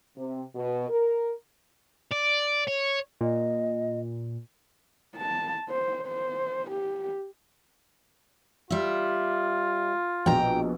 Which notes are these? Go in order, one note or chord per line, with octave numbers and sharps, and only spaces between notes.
C3
B2
A#4
D5
C#5
A#2 D#5
A5
C5
C5
G4
G3 F4 E5
A#1 B2 G5 A#5